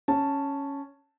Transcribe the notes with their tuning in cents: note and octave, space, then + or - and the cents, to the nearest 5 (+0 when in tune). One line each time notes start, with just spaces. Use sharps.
C#4 +0 A5 +0